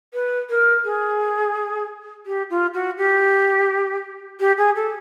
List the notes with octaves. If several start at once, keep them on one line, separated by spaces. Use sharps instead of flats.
B4
A#4
G#4
G4
F4
F#4
G4
G4
G#4
A4